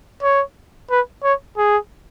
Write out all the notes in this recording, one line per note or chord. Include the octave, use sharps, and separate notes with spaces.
C#5
B4
C#5
G#4